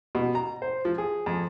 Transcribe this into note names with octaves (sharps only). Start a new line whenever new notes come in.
B2
A#5
C5
F3
G#4
F2